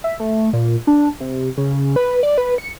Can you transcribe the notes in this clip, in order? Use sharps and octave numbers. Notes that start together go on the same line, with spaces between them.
E5
A3
A#2
D4
C3
C#3
B4
D5
B4
C#7